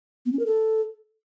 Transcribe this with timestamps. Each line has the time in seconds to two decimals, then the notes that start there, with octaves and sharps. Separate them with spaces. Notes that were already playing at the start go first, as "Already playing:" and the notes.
0.26 B3
0.33 C#4
0.39 A#4
0.46 A4